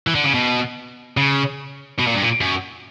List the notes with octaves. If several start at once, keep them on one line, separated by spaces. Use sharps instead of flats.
E3
D3
C#3
B2
C#3
B2
A#2
G2
A#2
F#2